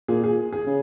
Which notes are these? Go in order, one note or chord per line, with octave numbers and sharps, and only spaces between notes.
A#2 G#4
G#4
G#4
C#3